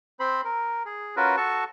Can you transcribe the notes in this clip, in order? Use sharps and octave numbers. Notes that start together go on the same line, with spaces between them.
C4 C5 B5
A#4
G#4
C#4 F4 F#4 A#4 B4
F#4 A4 A5 C#6